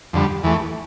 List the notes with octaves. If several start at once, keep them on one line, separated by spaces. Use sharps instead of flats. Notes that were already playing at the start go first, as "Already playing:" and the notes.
F2 D3 G3
E2 E3 A3